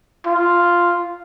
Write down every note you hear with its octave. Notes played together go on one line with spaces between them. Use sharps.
F4